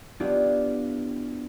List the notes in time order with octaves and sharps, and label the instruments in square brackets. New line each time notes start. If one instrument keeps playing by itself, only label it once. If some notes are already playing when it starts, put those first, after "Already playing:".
[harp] B3 D4 E4 F4 G4